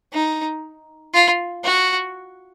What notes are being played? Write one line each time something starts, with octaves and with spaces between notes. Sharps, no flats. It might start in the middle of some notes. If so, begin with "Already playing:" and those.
D#4
F4
F#4